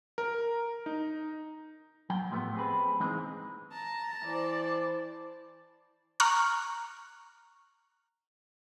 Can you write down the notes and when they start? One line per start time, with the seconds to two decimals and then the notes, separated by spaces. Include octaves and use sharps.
0.18 A#4
0.86 D#4
2.10 F#3 G5
2.31 A2 F3 A3 B3 G4
2.55 C4 G#4 B4
3.00 E3 G#3 C4 D#4
3.72 A5 A#5
4.25 E3 C5 D5
6.20 A#5 C#6 F6 F#6